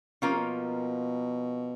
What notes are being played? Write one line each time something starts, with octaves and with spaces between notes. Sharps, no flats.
B2 F3 A#3 C#4 F4 A#4
C3
B2